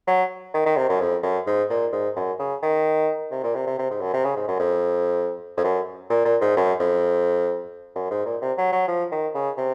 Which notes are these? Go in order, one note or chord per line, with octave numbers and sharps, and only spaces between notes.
F#3
D#3
D#3
C3
F#2
F2
F#2
G#2
A#2
G#2
F#2
C#3
D#3
C3
A#2
C3
C3
C3
G#2
F#2
C3
C#3
G#2
F#2
F2
F2
F#2
A#2
A#2
G#2
F#2
F2
F#2
G#2
A#2
C3
F#3
F#3
F3
D#3
C#3
C3